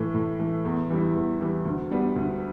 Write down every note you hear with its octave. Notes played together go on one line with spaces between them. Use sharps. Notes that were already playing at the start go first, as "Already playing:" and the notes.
Already playing: A2 E3 A3
A2
E3 A3
E2
E3 G3 E4
E2
E3 G3 E4
D2
D3 G3 B3 D4
D2